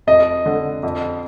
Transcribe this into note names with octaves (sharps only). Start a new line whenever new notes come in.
F2 D#5
D3
F2